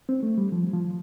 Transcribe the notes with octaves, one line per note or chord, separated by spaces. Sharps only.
C4
A3
G3
F3
F3